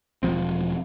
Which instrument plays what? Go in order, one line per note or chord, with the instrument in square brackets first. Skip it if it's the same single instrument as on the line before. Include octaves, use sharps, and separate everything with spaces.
[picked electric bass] E1 F#2 F3 C4